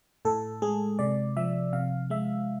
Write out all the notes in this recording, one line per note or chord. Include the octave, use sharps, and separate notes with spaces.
A2 A4
G#3 G#4
C3 D5
F3 E5
C3 F5
G#3 E5